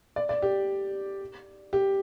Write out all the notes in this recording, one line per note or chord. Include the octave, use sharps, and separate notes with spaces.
D5
D5
G4
G4